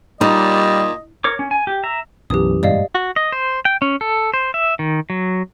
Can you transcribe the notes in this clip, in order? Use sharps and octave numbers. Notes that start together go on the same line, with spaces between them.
A#2 G3 D#4 D#5
A#4 C#5 D6
C#4
G#5
G4
E5 A#5
B1 F#2 E3 G4 D#6
G2 A#2 G#3 D5 D#5 F5
F#4
D#5
C5
G5
C#4
A4
C5
E5
D#3
F#3